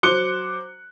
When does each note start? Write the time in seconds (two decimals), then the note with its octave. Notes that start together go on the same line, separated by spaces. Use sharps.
0.03 F#3 C5 D6 F#6 C#7 G7